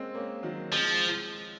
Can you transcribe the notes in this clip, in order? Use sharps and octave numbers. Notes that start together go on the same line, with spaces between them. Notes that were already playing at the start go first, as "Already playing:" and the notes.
Already playing: G#3 A#3 C4 C#4
A#3 C#4
D#3 F#3
F3 G#3 C4